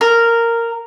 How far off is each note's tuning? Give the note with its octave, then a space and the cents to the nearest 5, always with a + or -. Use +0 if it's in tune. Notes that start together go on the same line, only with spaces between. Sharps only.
A#4 -10